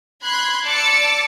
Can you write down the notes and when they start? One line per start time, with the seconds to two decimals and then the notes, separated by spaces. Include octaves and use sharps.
0.23 B5 C6 F#6 G#6
0.66 D5 A5 D6 E6 A6 C#7